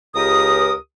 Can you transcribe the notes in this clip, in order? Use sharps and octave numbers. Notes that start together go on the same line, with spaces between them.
C#2 G4 A#4 D#6